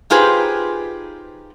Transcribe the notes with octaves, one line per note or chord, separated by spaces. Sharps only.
D#4 F4 G4 G#4 B4 C5